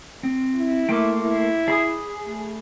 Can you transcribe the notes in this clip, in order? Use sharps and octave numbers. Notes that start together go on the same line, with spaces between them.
C4
E4
A3 A#3 G5 C6 D6
E4
G#4 D5 B5 D#6
A3